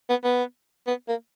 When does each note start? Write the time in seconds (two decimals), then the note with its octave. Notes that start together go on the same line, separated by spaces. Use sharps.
0.10 B3
0.24 B3
0.87 B3
1.08 A#3